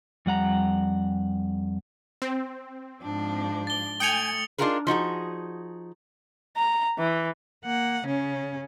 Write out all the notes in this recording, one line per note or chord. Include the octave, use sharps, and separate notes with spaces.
F2 G3 F#5 A#5
C4
G#2 F3 D4
A6 G7
A3 G5 G#5 D#6 C#7 F7
D4 D#4 F4 G#4 A#4 B4
F3 D#4 F#4 G#4
A#5
E3
A#3 F#5
C#3 C#4